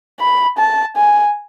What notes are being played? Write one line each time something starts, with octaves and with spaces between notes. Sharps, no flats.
B5
A5
G#5